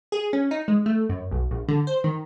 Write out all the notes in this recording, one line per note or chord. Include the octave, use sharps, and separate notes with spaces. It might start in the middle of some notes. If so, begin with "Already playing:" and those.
G#4
C#4
D#4
G#3
A3
F#2
B1
A#1
D3
C5
D#3